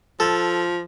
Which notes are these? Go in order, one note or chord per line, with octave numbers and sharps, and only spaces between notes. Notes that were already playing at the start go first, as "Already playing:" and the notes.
F3 A4